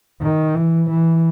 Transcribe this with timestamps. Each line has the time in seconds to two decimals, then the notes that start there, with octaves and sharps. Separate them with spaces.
0.22 D#3
0.55 E3
0.89 E3